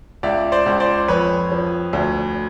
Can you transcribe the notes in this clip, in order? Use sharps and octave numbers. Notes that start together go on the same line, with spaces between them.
C#2 D5 E5
C5 D5
C#2
C5 D5
F2 B4 C#5
F3
D2